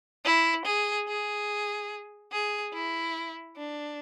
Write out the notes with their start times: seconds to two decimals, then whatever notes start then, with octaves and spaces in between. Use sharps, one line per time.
0.25 E4
0.66 G#4
1.08 G#4
2.32 G#4
2.73 E4
3.56 D4